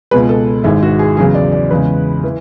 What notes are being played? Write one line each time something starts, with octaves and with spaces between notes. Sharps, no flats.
C#2 B2 G#3 B4
A4
G#1 G#2 G#3 E4
F#4
G#4
E2 C#3 F#3 G#4
D5
D5
E2 C#3 G#3 B4
E3